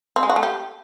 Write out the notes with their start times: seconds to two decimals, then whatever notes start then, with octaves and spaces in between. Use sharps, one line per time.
0.16 C4
0.23 G#3
0.30 F#4
0.36 A3
0.43 G4